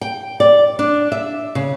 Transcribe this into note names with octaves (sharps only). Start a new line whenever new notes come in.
G5
D5
D4
E5
C#3